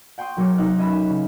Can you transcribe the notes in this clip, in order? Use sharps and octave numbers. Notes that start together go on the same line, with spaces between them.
F#5 G5 C6 C#6 D#6
B1 F#3 A#4 D6 C#7
C3 D#4 E6 F#6
C#4 D#5 E5 B5
C#3